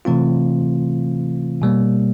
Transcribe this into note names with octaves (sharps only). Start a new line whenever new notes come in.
C3 E3 A3 C4 F4
B2 G3 A#3